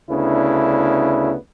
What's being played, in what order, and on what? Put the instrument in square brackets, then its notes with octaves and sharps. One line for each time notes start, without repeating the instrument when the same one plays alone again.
[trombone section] D2 C#3 B3 D4 E4